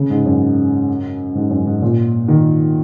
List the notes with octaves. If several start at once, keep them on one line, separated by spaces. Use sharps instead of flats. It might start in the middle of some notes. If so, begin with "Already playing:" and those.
Already playing: C#3
G#2
F#2
G#2
F#2
G#2
A#2
D#3